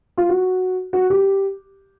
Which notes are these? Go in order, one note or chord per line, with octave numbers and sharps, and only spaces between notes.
F4
F#4
F#4
G4